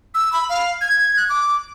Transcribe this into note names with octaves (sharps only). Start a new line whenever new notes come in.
E6
B5
F5
G#6
F#6
D6